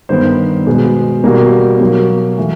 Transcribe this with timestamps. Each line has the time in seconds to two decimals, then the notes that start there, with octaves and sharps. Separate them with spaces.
0.09 G2 D#3 G3 B3 C5
0.67 B2 G#3 B3
1.24 B2 G3 A#3
1.80 B2 F#3 A#3
2.38 E3 A3